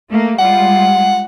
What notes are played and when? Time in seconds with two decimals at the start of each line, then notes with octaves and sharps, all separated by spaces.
0.10 A3 A#3
0.39 G3 G#3 F4 F#5